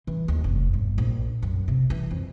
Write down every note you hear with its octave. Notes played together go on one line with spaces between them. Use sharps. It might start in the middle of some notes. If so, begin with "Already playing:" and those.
E3
D#2
F1
G1
A#1
F#2
C3
E3
F2